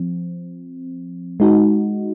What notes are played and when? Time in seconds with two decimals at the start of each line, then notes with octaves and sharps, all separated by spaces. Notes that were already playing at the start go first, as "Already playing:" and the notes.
Already playing: F3 C4
1.40 G#3 D#4 F#4